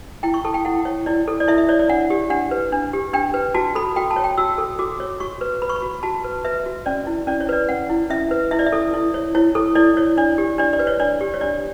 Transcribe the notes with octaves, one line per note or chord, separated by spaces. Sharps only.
E4 G5
C#6
A4 A5
G5
E4 F#5
C#5
E4 D5
A4
D5
E4 E5
E5
C#5 D5
D5
D4 F#5
G4
D4 F#5
B4
D4
G4
D4 G5
B4
F#4 A5
A4 B5
F#4 G5
A5
C#5
G5
F#4 E6
A4
F#4 D6
C#5
F#4 C#6
B4
B4 B5
C#6
B5
F#4
F#4 A5
B4
B4 E5
F#4
C#4 D5
E4
C#4 D5
C#5
B4 D5
C#4 F#5
E4
C#4 E5
B4
E4 E5
D5
E5
A4
E4
C#5
E4 C#5
A4
E4 D5
C#5
D4 D5
G4
D4 D5
D5
B4
C#5
D4 D5
G4
C#5
D4 D5